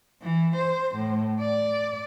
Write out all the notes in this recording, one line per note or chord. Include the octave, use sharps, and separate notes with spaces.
E3
C5
A2
D5